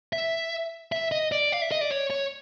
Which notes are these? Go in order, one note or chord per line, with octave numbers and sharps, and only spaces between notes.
E5
E5
D#5
D5
F5
E5
D#5
D5
C#5
C#5